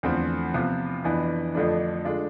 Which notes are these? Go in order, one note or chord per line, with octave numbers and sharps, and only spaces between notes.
E2 D3 F3 A3 C4
C3 F3 B3 F4
F2 E3 B3 D4
F2 D3 F3 A3 D4
D3 G#3 D4 F4